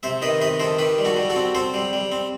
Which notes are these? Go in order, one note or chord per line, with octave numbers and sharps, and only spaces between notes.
C3 C5 E5
D#3 B4 D#5
C3 B4 D#5
D#3 A4 C5
D#3 G4 B4
G3
F#4 A4
G3
F#4 A4
C4
C4 A4 C5
G3
G3
C4